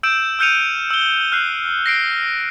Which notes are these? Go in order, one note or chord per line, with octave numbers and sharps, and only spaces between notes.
E6 G6 D7 E7
E6 F6 G6 C#7 D#7 F7
E6 G7
F6 F#6 C7
A#6 C7 D7